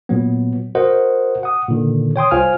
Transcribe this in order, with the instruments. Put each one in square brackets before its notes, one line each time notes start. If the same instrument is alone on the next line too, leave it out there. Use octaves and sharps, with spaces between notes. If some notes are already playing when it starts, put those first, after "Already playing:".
[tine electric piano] A#2 F#3 B3
F#4 A#4 C5 D#5 F#5
F#5 D#6
A#2 D3 D#3
C#5 G5 C6 D#6
C2 F4 C5 F5 G#5 F6